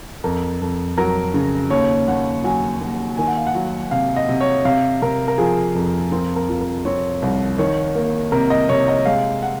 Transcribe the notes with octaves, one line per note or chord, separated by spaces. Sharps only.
F2 A#4
F2
F#3 A#4
C#3
D#2 C#5
D#2 F#5
F#3 G#5
D#2
D#3 G#5
F#5
F5
F#5
F#3
C3 F5
D#5
C3
C#5
C3 F5
C3 A#4
A#4
F3 G#4
F2
C4 A#4
A#4
F3
A#4
C4 C#5
C2
D#3 C#5
A#3
C3 A#4
D#5
C3 C#5
D#5
G#3 F5
F#5